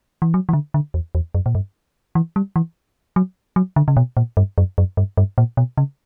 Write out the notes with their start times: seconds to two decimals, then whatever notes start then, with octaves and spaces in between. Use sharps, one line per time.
0.22 E3
0.34 F#3
0.49 E3
0.53 D3
0.74 D3
0.94 E2
1.15 E2
1.35 F#2
1.46 A#2
1.55 G2
2.15 E3
2.36 G3
2.56 E3
3.16 F#3
3.56 F#3
3.76 D3
3.88 C#3
3.97 B2
4.17 A#2
4.37 G2
4.58 F#2
4.78 F#2
4.97 G2
5.17 G2
5.38 A#2
5.57 B2
5.78 C#3